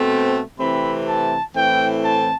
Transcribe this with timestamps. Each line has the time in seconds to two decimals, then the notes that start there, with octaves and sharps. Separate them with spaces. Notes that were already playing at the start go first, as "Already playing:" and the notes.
Already playing: B2 A3 C4
0.59 C3 E3 A3 C4 B5
1.07 A5
1.55 A2 E3 A3 C4 G5
2.03 A5